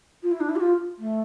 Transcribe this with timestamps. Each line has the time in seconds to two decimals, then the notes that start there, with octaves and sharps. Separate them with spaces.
0.23 F4
0.31 E4
0.40 D4
0.49 E4
0.56 G4
0.60 F4
0.99 A3